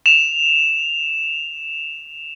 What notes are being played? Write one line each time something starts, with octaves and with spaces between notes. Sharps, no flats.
E7 F7